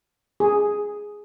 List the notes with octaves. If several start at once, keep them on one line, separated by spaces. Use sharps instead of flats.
G#4